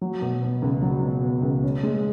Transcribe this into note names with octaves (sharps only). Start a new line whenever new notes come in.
F#3
B2
B3
C#2
F#3
B2
B3
C#2
C#4
G#3